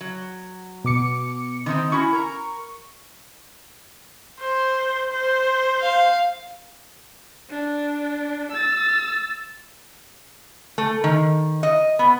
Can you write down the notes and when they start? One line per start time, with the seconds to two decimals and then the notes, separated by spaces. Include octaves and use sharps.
0.01 F#3
0.85 B2 D6 C#7
1.66 D#3 C4 D#4
1.92 C#4 E4 F#4 C#6
2.13 A#4 A#5
4.40 C5
5.12 C5
5.82 F5
7.50 D4
8.52 E6 A6
10.78 A3
11.04 D#3
11.63 D#5
11.99 B3